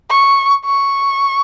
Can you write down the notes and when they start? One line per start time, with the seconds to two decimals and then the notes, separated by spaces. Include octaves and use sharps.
0.10 C#6
0.65 C#6